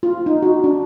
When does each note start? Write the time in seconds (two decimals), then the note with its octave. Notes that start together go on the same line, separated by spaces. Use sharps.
0.03 F4
0.26 D#4
0.42 F#4
0.64 D4